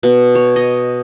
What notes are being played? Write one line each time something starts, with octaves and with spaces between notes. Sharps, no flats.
B2
C#5
D#5